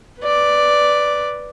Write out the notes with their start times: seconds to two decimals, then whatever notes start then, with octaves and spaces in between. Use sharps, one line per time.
0.20 B4 D5